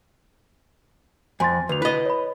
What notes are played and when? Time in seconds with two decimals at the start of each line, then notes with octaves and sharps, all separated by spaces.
1.40 F2 G#5 C6 A6
1.69 D2 B4 F7
1.82 E4 B4 D#5
2.06 C#5 B5